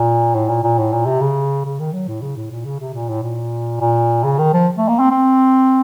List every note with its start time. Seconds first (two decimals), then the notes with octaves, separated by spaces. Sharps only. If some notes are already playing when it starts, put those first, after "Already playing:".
Already playing: A#2
0.35 A2
0.49 A#2
0.63 A#2
0.78 A2
0.93 A#2
1.06 C3
1.21 C#3
1.65 C#3
1.79 D#3
1.93 F#3
2.08 A2
2.22 C#3
2.37 A2
2.51 A#2
2.65 C#3
2.80 C3
2.94 A#2
3.09 A2
3.23 A#2
3.81 A#2
4.24 C#3
4.38 D#3
4.53 F3
4.78 A3
4.88 A#3
4.99 C4
5.11 C4